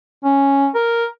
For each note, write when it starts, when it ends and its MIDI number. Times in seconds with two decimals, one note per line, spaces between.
0.24 0.69 61
0.75 1.05 70